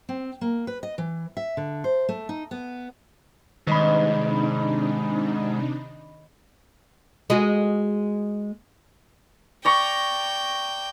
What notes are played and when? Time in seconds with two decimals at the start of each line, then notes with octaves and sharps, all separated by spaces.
0.09 C4
0.41 A#3
0.67 B4
0.83 D#5
0.98 E3
1.37 E5
1.57 D3
1.84 C5
2.09 A3
2.29 D#4
2.51 B3
3.67 G#2 C3 D#3 D4 D#4 C#5 D#5 B5
7.30 G#3 F#4
9.65 D5 G5 A#5 C#6